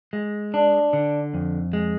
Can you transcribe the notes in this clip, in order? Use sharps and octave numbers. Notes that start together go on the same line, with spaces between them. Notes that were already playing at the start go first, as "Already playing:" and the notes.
G#3
D4
D3
F2
G#3